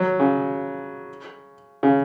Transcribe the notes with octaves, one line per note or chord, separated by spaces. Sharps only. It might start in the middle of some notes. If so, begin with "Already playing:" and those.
Already playing: F#3
C#3
C#3